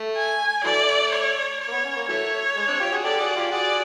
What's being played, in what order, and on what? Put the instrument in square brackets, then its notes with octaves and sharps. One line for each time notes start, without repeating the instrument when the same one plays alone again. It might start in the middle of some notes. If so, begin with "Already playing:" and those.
Already playing: [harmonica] A3
[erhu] G#5
[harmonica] E3 F#3 A3 [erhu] D5
[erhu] C#5
C#5
[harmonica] A#3
B3
C#4
A#3
[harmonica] E3 F#3 A3 [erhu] C#5
[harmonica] G#3
C4 D4
F4 G4
F#4 G#4
[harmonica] G4 A4 [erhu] D5
[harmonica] F#4 G#4
F4 G4
[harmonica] F#4 G#4 [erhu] D5